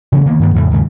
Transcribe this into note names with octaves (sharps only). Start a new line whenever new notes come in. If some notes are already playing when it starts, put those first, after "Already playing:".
C#3 E3 F#3 A#3
D#3 A#3 B3
G2 D#3 A#3
F2 A2 C#3
D#2 G#2 C#3